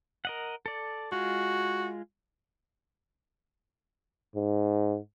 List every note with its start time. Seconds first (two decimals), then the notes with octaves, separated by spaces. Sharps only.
0.25 A#4 D#5 F#5
0.66 A4 D5
1.12 G#3 F4 F#4
4.36 G#2